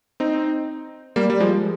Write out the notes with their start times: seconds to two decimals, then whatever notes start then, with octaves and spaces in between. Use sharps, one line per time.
0.20 C4 D#4
1.16 G3 A#3
1.30 G3
1.40 F3 G#3